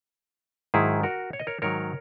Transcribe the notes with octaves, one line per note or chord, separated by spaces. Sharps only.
G#2 D#3 F#3 E4 G#4
F#4 A#4
C#5
D#5
A#4 C#5
G#2 D#3 F#3 A#4 C#5